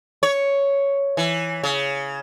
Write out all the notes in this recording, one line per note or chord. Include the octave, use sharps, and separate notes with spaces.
C#5
E3
C#3